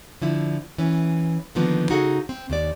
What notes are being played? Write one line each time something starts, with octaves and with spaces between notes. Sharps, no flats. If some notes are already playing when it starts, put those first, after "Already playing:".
D3 F3 E4
E3 C#4
D3 D#3 F3 A#3 B3
C#3 D#4 F#4 G#4 A4 F#5
C4
D#2 D#3 D5